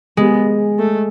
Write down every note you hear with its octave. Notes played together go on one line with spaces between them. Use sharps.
G#3 B3
A3